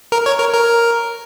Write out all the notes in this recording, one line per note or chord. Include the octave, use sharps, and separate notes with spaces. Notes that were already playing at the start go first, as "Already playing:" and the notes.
A#4
C#5
A#4
A#4